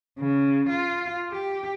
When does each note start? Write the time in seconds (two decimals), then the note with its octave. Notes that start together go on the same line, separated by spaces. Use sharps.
0.19 C#3
0.69 F4
1.32 G4